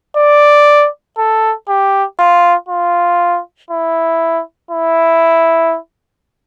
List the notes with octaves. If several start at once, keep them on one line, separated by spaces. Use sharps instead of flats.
D5
A4
G4
F4
F4
E4
E4